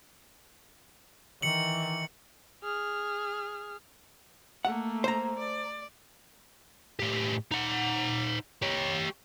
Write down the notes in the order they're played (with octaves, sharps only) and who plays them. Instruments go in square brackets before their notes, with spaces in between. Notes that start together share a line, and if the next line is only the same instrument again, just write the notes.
[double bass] D#3 E3 [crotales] C#7 F#7
[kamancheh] G#4 F6
[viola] A3 A#3 [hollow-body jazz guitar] F#5
[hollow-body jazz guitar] C5 A#5
[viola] D5
[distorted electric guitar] A2 G4
D#4 F#5
G4 C#5